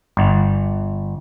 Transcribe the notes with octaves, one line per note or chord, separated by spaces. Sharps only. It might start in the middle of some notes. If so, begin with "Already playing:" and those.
G1